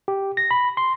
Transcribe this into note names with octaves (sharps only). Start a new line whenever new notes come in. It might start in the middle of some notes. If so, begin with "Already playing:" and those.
G4
A#6
B5
C6